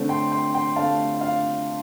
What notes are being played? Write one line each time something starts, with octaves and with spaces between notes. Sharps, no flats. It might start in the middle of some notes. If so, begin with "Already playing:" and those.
Already playing: D3 A3 C4
G5 C6
G5 C6
G5 C6
D3 A3 C4 F5 A5
F5